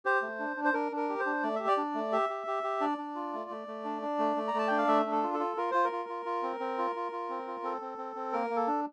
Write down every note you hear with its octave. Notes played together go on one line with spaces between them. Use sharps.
G4 C5
A3
D4
D4
C5
D4 A#4
D4 A#4
G4
C5
D4
A3 D5
G4 E5
D5
D4
A3
G4 E5
G4
G4
G4
D4 D5
D4
F4
A3
A3
A3
D4
D4
A3
A3
A#5
A3 A5
D4 G5
F5
A3 E5
D4
A4
F4
A4
F4
F4 A#4
F4 C5
A#4
F4
F4
F4
C4
C4
F4
F4
F4
C4
F4
C4 A4
C4
C4
C4
A#3 A#4
A#3
A4
D4